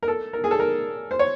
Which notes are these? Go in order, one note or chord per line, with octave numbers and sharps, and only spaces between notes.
A#4
A4
A#4
G#4
A4
A#4
C5
C#5